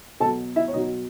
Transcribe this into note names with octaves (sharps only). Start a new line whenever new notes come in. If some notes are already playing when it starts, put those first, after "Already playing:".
B2 F#3 A4 A5
E4 E5
C#5
B2 F#3 D#4 D#5